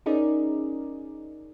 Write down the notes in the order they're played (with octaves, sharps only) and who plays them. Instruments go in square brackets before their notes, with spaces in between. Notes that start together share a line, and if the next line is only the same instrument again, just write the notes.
[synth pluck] C#4 D#4 G#4 A#4 D5